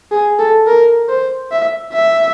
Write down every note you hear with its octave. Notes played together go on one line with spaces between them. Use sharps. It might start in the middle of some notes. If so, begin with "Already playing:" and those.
G#4
A4
A#4
C5
E5
E5